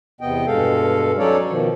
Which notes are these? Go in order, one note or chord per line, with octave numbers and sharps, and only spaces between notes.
E2 C3 B3 D#5 G5
G2 B2 G#3 A4 F5
F#3 C#4 D#4 A4 C#5 D5
B2 D#3 F3